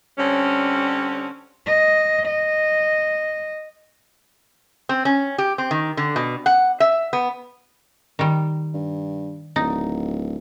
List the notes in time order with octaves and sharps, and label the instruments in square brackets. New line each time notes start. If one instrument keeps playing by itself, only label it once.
[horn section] D3 G3 C4 C#4
[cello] D#5
D#5
[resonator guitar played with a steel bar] C4
C#4
G4
C4
D#3
D3
B2
F#5
E5
B3
[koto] D#3 G3
[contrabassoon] G2
[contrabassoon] D1 [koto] D#4